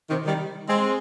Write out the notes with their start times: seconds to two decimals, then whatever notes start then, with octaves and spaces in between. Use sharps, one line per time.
0.10 C3 D#3
0.25 D#3 G3
0.68 G#3 C4